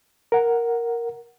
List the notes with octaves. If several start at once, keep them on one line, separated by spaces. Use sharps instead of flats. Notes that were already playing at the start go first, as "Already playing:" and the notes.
A#4 F#5